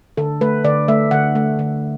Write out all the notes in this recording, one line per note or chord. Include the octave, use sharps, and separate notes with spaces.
D3 A4
A3 B4
D3 D5
A3 E5
D3 F#5
A3
D3